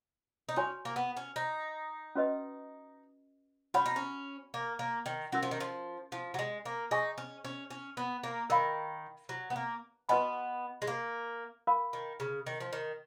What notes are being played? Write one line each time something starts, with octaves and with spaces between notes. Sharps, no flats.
D#4
C#4 F#4 C#5 G#5
A#3
B3
C#4
D#4
C#4 F#4 B4 D#5
C#4 F#4 C#5 F#5 B5
D#4
C#4
A#3
A#3
D#3
F#3 C#4 F#4 A#4
F3
D#3
F3
F3
F#3
G#3
A#3
D#4 G#4 D#5 G#5 C#6
C#4
C#4
C#4
B3
A#3
D#3 A#4 F5 B5
F#3
B3
A#3
B3 F#4 B4 D#5 G#5 B5
G#3
A#3
A#4 F5 B5
D#3
C#3
D#3
F3
D#3